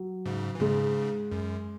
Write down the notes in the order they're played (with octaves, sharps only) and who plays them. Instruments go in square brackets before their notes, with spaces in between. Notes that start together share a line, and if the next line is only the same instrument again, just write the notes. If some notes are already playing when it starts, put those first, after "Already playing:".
Already playing: [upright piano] F#3
[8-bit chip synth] G#2 C#3
E3
[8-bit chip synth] G#2 C#3 [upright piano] G#3
[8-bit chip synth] F#2